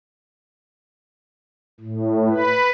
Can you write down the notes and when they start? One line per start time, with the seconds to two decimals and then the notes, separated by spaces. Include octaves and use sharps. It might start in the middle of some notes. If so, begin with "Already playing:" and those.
1.80 A2
2.29 B4